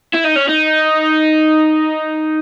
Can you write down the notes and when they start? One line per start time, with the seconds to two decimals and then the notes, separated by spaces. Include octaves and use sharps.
0.14 E4
0.24 D#4
0.36 C#4
0.48 D#4